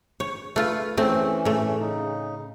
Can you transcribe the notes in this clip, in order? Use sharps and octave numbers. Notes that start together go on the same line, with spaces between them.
C#5
A3 F4 B4
E3 A3 C4 C#4
A2 A3
C#3 D#4